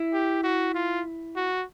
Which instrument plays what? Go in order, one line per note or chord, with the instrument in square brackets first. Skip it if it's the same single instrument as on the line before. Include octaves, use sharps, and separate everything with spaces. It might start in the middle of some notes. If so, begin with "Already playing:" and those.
Already playing: [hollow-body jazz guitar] E4
[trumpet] G4
F#4
F4
F#4